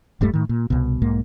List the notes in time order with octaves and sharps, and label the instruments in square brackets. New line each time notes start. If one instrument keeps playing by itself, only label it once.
[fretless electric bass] D#1 G2 G3 A3
A2 D#3
A#2
C2 B2
B1 G#2 A#3